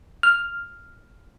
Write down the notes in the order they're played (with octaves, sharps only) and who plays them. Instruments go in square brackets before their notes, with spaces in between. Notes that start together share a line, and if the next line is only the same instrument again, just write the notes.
[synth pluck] F6